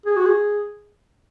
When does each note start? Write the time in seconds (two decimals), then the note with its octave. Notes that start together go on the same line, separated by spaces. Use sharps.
0.06 G#4
0.16 F#4
0.26 G#4